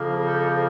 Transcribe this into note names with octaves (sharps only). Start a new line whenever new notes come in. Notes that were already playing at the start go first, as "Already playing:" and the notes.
Already playing: F2 C#3 F3 A#3
G4 A4